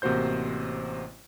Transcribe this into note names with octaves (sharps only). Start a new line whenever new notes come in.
A1 C3 A#3 F#4 C5 G6